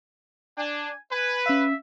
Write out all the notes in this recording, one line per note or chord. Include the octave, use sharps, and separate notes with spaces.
D4 G#5
B4 G#5
C#4 E5 F5